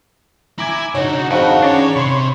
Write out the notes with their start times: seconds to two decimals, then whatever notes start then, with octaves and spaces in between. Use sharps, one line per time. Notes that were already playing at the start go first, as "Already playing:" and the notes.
0.59 E4 G#5 A#5 D6 G#6
0.95 C#3 D4 D#4 F#4 C#5
1.31 F2 G#4 F#5 B5 C#6 F#6
1.62 C#4 D4 C#5 A5 A#5
1.96 C3 B5 C6